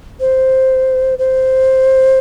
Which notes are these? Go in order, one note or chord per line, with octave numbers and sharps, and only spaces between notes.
C5
C5